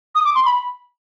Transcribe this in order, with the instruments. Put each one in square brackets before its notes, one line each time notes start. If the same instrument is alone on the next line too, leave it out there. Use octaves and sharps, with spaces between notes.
[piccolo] D#6
D6
C6
B5